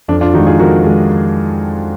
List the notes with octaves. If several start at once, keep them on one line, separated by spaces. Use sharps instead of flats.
F2 D4
D4 F4
D#3 G#3 D#4 F#4
F4 G#4
F2 F#4 A#4
D#3 G#3